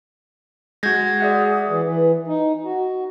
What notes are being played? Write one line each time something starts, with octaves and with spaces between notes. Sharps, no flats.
G#3 F#4 G6 G#6 A#6
G#4 D5 E5 F#5
E3
E3
D#4
F#4